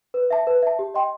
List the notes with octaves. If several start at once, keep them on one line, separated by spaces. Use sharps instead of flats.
B4
E5 A5
B4
E5 A5
G4
D#5 G5 C6